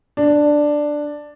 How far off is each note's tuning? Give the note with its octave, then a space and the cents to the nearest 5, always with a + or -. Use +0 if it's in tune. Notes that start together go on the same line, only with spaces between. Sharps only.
D4 +5